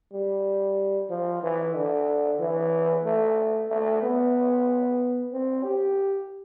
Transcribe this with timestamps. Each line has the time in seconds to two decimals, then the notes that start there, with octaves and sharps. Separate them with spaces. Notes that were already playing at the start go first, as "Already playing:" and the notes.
0.13 G3
1.10 F3
1.43 E3
1.76 D3
2.40 E3
3.05 A3
3.69 A3
4.03 B3
5.33 C4
5.64 G4